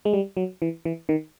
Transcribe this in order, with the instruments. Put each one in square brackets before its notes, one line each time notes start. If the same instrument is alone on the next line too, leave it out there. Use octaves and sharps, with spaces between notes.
[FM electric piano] G#3
G3
F#3
E3
E3
D#3